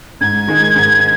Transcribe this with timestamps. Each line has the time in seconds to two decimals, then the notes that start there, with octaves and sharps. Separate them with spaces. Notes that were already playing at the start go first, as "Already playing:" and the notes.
0.21 G#2 G#6
0.47 D#3 G#3 D#4
0.76 G#2